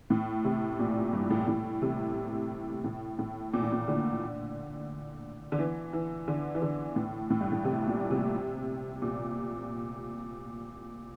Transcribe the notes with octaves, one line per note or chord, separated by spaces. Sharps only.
A2
C3
A#2
G2
A2
A2
C3
A2
A2
A#2
A2
A#2
D3
D3
E3
E3
D3
E3
D3
A2
A2
G2
A2
C3
A#2
C3
A#2